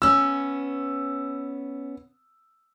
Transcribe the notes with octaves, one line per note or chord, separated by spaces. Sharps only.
B3 C#4 E6